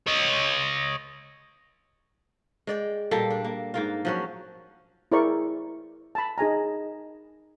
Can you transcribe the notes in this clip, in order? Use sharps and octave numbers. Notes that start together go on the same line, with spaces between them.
C#5 D#5
G#3 D5 G5
A#2 G3 A#3 A4
D4
A#3
G#2 A#3 F4
F3 F#3 C#4
E4 G#4 A#4 C5 D5 C#6
A5 B5
D#4 G#4 G#5 A#5